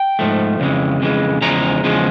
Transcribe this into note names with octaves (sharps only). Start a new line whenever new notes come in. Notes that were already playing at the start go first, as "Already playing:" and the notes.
Already playing: G5
G#2 F3 A3
F2 C#3 E3 G#3
F2 C#3 E3 G#3
E2 C#3 F3 G#3 A#5
E2 C#3 F3 G#3